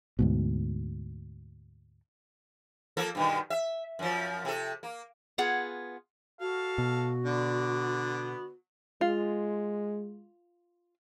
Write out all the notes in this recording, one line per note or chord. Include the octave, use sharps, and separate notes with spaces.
D2 G#2 B2
F3 A#3 A4
G2 B2 D#3
E5
F#2 F3
C3 A4
A#3
B3 F4 G#4 F#5
F#4 A4 F5
B2
D3 B3 D5
G#3 F4